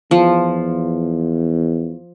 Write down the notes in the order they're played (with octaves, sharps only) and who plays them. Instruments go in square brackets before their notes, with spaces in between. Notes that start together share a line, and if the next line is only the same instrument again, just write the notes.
[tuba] E2 [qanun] F3